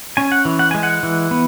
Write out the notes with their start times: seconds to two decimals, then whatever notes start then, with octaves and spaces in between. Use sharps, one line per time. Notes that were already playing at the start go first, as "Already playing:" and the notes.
0.17 C#4 G#5
0.32 F#5
0.45 E3
0.59 F#5
0.71 G#3 G#5
0.83 F#5
1.03 E3
1.31 B3